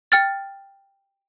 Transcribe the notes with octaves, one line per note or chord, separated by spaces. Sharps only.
G5 F6 A6